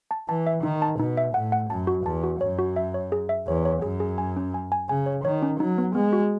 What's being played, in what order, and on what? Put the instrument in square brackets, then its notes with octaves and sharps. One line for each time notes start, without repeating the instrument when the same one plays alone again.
[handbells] A5
[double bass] E3 [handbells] A5
[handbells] E5
[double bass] D#3 [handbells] D#4
[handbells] A5
[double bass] B2 [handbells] D#4
[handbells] E5
[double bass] A2 [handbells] F#5
[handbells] F#5
[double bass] F#2 [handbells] A5
[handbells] F#4
[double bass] E2 [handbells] A5
[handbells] F#4
[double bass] F#2 [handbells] C#5
[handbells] F#4
E5
C#5
G#4
E5
[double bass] E2 [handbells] C#5
[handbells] C#5
[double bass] F#2 [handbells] G#4
[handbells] G#4
G#5
C#4
G#5
G#5
[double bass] C#3 [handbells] G#5
[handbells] C#5
[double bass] D#3 [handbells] C#5
[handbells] C#4
[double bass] F#3 [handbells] D#4
[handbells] B3
[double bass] G#3 [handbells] B3
[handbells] F#4